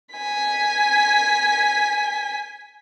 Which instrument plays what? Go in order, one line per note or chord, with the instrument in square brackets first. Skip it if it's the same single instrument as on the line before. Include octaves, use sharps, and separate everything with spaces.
[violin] G#5 B6